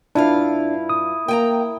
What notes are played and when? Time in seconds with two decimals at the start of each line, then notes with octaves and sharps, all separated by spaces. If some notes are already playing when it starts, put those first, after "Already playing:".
0.15 G2 D4 E4 F4 F5
0.89 D#6
1.28 A#3 G5 G#5 A#5